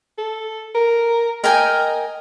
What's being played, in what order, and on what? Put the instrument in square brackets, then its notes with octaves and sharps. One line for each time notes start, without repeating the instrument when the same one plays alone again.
[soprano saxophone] A4
A#4
[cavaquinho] A#4 G5 G#5 [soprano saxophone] D#5